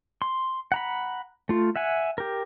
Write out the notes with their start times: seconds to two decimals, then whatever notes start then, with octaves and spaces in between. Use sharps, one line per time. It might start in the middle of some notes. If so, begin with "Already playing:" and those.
0.22 C6
0.72 F#5 A#5 B5
1.49 A3 F4
1.76 E5 F#5 G#5
2.18 G4 A#4